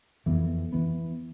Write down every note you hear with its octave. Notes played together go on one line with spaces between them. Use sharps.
F2 E3 B3
E3 B3